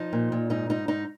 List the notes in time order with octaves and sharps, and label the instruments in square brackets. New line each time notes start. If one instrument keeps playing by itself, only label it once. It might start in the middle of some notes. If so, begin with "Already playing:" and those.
Already playing: [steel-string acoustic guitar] F3 D#4
A#2
A#2
G#2 D#4
G#2 D#4
G#2 D#4